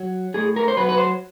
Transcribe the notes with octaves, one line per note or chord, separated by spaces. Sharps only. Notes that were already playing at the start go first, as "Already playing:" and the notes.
Already playing: F#3
A2 G#4
A#4
C5
F#3 B4
B4
C5